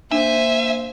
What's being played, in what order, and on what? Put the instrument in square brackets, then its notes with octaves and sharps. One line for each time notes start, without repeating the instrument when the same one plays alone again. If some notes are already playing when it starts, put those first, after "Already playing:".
[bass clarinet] A#3 [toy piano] D4 [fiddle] C5 G#5 [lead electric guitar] E5